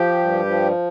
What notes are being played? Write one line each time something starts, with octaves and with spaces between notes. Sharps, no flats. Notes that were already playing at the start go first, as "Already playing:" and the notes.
Already playing: F3 G4
G2
F3